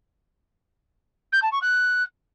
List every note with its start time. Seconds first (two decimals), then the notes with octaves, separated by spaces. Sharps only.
1.32 G6
1.42 A5
1.52 C#6
1.62 F#6